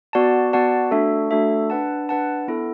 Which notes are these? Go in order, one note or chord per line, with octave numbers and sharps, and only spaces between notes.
B3 F#4 D5 F#5 A5
B3 F#4 D5 F#5 A5
A3 D4 F#4 A4 E5
A3 D4 F#4 A4 E5
D4 B4 F#5 A5
D4 B4 F#5 A5
B3 E4 A4